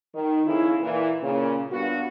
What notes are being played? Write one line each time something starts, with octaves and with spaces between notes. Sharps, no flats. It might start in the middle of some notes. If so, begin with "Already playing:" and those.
D#3
F2 C#3 D#4 E4
A#2 E3
A#2 C#3
G2 B3 F4 F#4